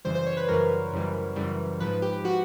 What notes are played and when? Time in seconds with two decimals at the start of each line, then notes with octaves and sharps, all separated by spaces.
0.05 F#2 C#3 E3 G3 C5
0.15 C5
0.26 C#5
0.37 B4
0.48 F#2 C#3 E3 G3 A#4
0.93 F#2 C#3 E3 G3
1.36 F#2 C#3 E3 G3
1.80 G#2 F3 B4
2.02 G4
2.24 F3 F#4